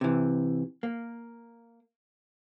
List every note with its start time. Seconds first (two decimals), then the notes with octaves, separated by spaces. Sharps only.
0.01 C3 E3
0.83 A#3